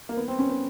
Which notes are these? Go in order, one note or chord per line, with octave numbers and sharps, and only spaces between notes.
A#3
B3
C4
C#4
B3